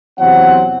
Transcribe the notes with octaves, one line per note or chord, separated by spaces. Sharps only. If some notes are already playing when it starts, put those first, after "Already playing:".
E2 C3 F#3 C4 F#5